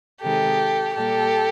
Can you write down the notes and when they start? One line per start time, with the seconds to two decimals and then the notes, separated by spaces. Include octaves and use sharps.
0.22 C3 D#3 G#3 G4 A4
0.95 A#2 G3 A#3 G4 A4